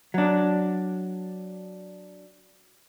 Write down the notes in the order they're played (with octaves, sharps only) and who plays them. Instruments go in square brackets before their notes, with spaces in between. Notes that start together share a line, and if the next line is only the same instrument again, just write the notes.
[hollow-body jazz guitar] F#3 D4